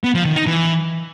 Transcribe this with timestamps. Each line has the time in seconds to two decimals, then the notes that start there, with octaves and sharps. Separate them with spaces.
0.04 B3
0.14 F3
0.25 D#3
0.36 D#4
0.47 E3